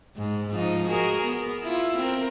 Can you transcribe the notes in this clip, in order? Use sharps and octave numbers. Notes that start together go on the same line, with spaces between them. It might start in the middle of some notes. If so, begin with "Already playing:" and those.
G#2
G#2 F3 D#4
F#4 G#4 A#4
B3
E4 F4
C4 A#4